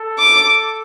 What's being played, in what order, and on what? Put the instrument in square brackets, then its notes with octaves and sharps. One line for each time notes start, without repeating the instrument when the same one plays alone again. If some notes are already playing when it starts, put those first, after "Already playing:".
Already playing: [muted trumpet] A4
[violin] D6